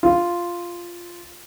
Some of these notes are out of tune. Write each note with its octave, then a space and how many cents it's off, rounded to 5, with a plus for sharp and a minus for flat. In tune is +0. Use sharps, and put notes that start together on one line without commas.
F4 -5